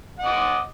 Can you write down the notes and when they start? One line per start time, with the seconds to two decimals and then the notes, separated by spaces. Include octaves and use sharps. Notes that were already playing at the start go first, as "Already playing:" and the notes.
0.19 F#5
0.22 D#5
0.26 D6